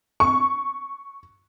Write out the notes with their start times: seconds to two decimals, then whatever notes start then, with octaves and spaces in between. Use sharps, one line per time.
0.20 C#6